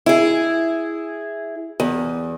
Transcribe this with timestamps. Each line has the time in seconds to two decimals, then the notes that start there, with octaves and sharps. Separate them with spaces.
0.06 E4 G#4
1.80 E2